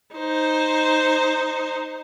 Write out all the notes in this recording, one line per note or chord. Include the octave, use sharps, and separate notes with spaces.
D#4 C5